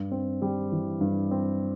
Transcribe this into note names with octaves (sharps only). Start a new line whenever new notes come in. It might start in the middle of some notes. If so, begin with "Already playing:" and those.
Already playing: G2
C4
G3
E3
G2
C4